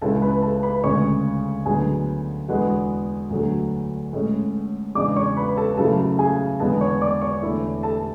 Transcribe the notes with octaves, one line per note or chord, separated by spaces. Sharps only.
C#2 C#3 G#3 C#4 E4 A4 A5
B4 B5
A4 A5
B4 B5
D2 C#3 G#3 C#4 C#5 C#6
D2 D3 F#3 B3 G#4 G#5
E2 D3 G#3 B3 F#4 F#5
D2 D3 F#3 A3
A2 G#3 C#4
E2 C#3 G#3 D4 D5 D6
C#5 C#6
B4 B5
A4 A5
F#2 C#3 F#3 A3 E4 A4 A5
G#4 G#5
E2 D3 G#3 B3 A4 A5
C#5 C#6
D5 D6
C#5 C#6
E2 D3 A3 E4
A4 A5